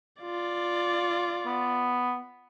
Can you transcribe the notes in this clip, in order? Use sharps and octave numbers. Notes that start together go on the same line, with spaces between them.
F4 D5
B3